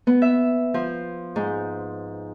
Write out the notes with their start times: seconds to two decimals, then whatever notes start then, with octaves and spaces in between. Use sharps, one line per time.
0.07 B3
0.22 E5
0.74 F3
1.36 G#2